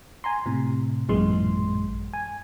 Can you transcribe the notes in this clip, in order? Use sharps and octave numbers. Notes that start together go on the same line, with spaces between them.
G#5 A#5 C6
A2 C3
A1 F#2 A#2 E3 G#3 C6
G#5